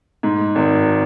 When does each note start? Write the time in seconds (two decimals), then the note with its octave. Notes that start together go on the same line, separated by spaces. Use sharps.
0.23 G#2
0.55 G#1